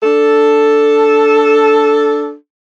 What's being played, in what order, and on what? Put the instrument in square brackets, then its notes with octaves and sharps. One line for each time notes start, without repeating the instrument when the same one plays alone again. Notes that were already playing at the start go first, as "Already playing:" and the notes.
[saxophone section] D4 A4